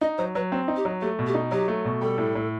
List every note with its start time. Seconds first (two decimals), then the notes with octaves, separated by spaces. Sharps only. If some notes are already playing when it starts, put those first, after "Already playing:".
0.01 D#4 D#5
0.18 F#3 C5
0.35 F#3 B4
0.52 C4
0.68 D#4
0.76 G4
0.85 F#3
1.01 A3 G4
1.19 B2
1.27 G4
1.34 D#4
1.51 F#3 G4
1.68 A3
1.85 B2
2.01 G3 A4
2.18 A2
2.35 A2